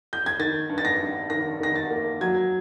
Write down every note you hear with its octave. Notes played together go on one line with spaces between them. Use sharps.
G6
G#6
D#3 A6
G2
A6
A#6
G2
D#3 A#6
D#3 A#6
A6
A#3
F#3 G#6